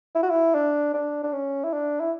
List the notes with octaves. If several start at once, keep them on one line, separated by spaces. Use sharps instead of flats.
E4
F#4
E4
D4
D4
D4
C#4
E4
D4
E4